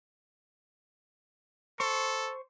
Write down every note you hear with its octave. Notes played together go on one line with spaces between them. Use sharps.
A4 C5 C#6